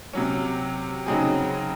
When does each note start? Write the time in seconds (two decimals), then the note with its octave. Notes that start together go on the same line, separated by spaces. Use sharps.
0.13 C3 F#3 C#4
1.06 C#3 F#3 C4 D#4 G#4